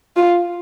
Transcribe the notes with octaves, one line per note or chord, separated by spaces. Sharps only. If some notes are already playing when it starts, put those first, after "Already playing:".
F4